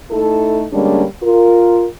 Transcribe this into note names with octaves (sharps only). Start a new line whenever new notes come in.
A3 D#4 E4 A4
D3 G3 G#3 A#3 C#4 D4
F4 A#4